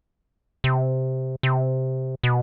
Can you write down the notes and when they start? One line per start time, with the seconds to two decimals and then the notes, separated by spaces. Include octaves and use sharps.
0.64 C3
1.43 C3
2.23 B2